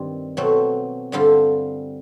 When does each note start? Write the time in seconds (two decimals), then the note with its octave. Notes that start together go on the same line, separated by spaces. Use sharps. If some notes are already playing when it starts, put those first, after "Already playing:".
Already playing: G2 D#3 C4
0.37 B2 F#3 A3 C4
1.12 G2 D3 G3 C4 F4